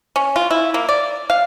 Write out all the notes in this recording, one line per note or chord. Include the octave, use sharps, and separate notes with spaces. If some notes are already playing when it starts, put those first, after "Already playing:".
C#4
F4
E4
A#3
D5
F5